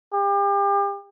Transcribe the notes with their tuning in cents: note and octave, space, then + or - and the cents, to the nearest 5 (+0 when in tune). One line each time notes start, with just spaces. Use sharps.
G4 +35